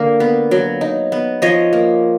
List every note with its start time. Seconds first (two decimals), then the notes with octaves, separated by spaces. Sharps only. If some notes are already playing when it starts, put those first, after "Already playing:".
Already playing: D3 A#3
0.20 B3
0.51 F#3
0.81 D#4
1.12 B3
1.42 F3 C#5 D#5
1.73 A#3